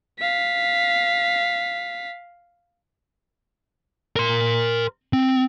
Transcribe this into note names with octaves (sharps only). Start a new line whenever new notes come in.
F5 B6
A#4 C6
C4